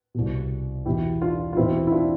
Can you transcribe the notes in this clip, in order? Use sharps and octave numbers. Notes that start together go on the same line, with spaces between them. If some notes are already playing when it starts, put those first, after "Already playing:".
C2 B2
E2 B2 E4 G4
D4 F4
F4
E2 B2 C4 E4
E4
D4 F4